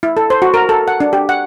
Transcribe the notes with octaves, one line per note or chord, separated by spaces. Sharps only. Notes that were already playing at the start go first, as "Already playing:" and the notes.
E4
A4
C5
F#4
A#4
A4
F#5
D4
G4
F#5